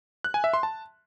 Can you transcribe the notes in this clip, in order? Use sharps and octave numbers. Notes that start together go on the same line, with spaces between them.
F#6
G#5
E5
C6
A5